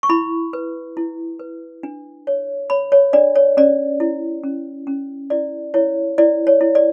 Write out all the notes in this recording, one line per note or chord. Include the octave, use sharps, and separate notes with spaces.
C#6
E4 B5
B4
E4
B4
D4
C#5
C#5 B5
C#5
D4 D5
C#5
C#4 D5
E4
C#4
C#4
E4 D5
E4 C#5
E4 D5
C#5
E4
D5